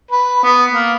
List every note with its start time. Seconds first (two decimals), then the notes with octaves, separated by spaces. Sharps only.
0.11 B4
0.43 B3
0.71 A#3